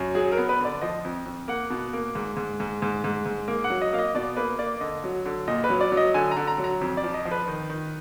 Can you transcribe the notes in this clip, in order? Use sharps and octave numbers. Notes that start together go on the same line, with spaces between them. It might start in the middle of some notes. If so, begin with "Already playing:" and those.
Already playing: F#2
F#3 G#4
A#4
B3
B4
D3 D5
F3 D#5
F2
F2
A#3 F#5
B2
A#3
G#2
G#2
G#2
G#2
G#2
G#2
A#3
F#5
F#3
D#5
A#3 F5
D#5
B2 D5
A#3 B4
A#3 D5
D3 D#5
F#3
D3
A#2 D#5
B4
F#3
D5
F#3
D#5
D3 G#5
A#5
D3
A#5
F#3
A#5
F2
D5
F3
D#5
F3
B4
D#3
D#3